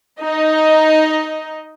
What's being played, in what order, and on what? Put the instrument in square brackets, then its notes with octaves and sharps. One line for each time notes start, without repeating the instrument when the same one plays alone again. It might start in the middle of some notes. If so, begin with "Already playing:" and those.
[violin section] D#4 D#5